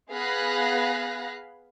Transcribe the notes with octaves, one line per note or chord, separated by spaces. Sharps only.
B3 G#4 F5 B5 F#6 A#6